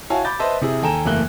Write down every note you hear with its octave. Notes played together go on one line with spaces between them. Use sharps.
E4 F#4 C#5 F5 G#5 A5
B5 D6 G6 A6
B4 C5 D#5 E5 A5
C3 E4 G#4
D#2 A4 G5 G#5 A#5 E7
F#1 E2 A3 A#3 F#6 G7